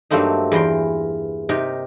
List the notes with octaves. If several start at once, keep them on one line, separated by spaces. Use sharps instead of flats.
G2 F#3 A3 A#3 C4 D#4
E2 E3 A#4 G5 C6
C3 D#4 G4 A#4